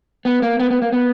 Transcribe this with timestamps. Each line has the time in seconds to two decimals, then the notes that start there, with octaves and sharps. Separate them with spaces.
0.25 B3
0.42 A#3
0.60 B3
0.70 B3
0.82 A#3
0.92 B3